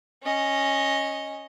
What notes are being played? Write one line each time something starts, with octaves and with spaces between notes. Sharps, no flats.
C#4 D#5